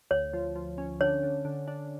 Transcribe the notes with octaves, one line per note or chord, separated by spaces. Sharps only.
D2 C#5
F3
F3
C#4
D3 C#5
D3
D3
D4